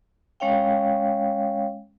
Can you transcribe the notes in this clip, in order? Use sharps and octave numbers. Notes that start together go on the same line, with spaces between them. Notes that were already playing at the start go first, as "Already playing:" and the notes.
G#3 C#4 C#5 F5 G5